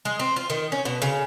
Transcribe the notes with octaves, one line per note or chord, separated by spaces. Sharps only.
G#3
C4
F4
D#3
C#4
B2
C#3